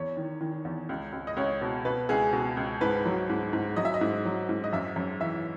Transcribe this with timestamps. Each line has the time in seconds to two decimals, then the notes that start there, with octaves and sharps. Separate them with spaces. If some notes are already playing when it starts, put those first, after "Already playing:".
Already playing: E2 C#5
0.17 D#3
0.41 D#3
0.65 E2
0.89 C#2
1.13 C#2
1.27 D#5
1.37 C#2 C#5
1.61 B2
1.85 B2 B4
2.09 C#2 G#4
2.33 B2
2.57 C#2
2.81 G#2 B4
3.06 F#3
3.29 G#2
3.53 G#2
3.76 F#3 D#5
3.85 E5
3.94 D#5
4.01 G#2
4.25 F#3
4.49 G#2
4.64 D#5
4.73 F#2 E5
4.96 F#2
5.21 E3 E5